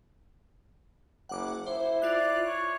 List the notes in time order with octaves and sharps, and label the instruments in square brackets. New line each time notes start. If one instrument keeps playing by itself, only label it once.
[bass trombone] F#1 [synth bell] F#5 D6
[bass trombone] E4 [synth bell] C5
[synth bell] F4 F#6 [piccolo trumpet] D5
[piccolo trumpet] C#5